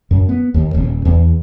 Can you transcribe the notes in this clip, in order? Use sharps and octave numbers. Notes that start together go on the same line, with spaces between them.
F#2
B3
D#2
D#1
E2